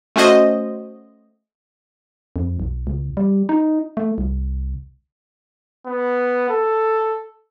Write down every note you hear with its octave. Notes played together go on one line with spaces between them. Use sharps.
A3 C#4 F#4 C5 D#5
F2
B1
C#2
G3
D#4
A3
C2
B3
A4